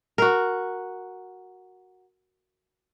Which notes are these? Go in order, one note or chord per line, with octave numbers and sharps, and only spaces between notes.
F#4 A#4